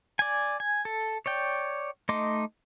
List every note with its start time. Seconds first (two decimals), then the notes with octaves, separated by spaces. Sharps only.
0.19 D5 G#5
0.60 G#5
0.85 A4
1.26 C#5 D5 G5
2.09 A3 D#4 D#5 C6 D6